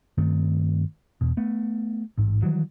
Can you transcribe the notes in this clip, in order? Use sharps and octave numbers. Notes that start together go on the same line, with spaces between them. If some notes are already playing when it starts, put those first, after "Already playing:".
G2 D#3 A3 C4
E2 B2
A3 B3
A1 G#2
D#3 E3 F#3 G3